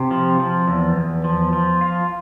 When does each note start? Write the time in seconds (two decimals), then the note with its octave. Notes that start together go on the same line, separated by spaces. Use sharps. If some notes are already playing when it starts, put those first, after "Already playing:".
Already playing: C3
0.11 F3
0.40 F3
0.67 E2
0.96 E2
1.24 F3
1.53 F3
1.81 F4